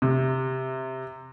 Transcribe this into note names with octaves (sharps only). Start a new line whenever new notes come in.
C3